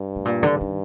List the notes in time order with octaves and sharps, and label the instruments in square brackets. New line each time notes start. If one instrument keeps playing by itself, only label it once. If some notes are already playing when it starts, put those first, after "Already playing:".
Already playing: [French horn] G2
[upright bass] A2
A#2
D3
D#3